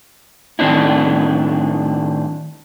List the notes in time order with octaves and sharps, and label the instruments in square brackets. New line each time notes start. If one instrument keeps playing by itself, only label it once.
[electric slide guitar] A2 D#3 C4 D4 E4